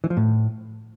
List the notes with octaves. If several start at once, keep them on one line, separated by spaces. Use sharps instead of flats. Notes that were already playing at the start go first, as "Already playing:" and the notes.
E3
F3
A2